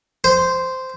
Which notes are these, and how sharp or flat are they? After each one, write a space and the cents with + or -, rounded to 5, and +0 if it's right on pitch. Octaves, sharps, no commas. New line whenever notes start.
C5 -10